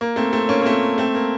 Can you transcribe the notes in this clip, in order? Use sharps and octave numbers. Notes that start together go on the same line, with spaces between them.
A#3
A3 C4
A3 C4
A#3 C#4
A#3
A3 C4
A3 C4
A#3